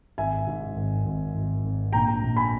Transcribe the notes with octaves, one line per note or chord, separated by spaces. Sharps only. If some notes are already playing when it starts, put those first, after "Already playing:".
G#1 E5 G#5
G#2
G#1
G#1
G#1
G#1
A#1 G5 A#5
A#1
G#5 B5